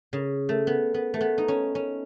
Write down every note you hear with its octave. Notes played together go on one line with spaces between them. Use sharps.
C#3
A3
B3
B3
A3
B3
D#4
C#4
C#4